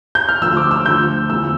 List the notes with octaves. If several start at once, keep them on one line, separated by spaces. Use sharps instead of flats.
G6
F6
D2 D3 F3 E6
D6
E6
D2 D3 F3 G6
E2 D3 F3 E6